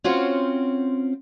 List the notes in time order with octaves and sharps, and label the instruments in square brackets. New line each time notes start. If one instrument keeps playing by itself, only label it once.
[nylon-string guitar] C4 C#4 F4 F#4 C5 C#5